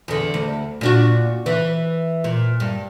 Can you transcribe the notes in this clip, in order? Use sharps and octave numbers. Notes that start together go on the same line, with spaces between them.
E2 D3
D2
A#2 D4 F#4
E3
A#2
G2